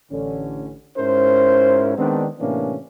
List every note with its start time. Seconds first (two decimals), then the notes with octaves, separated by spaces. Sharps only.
0.11 A1 D3 C#4
0.97 G#2 C#4 E4 A#4 C5
1.97 D#3 G#3 B3 C4 D4
2.40 A2 C3 E3 A#3 C#4 D4